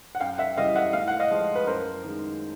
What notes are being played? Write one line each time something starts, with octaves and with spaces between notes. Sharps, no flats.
F#5
F#2 F5 G5
E5 F#5
C#3 E3 G3 D#5 F5
E5 F#5
A2 F5
F#5
D#5 F5
F3 G#3
B4
F#2 A#4 C5
D#3 G#3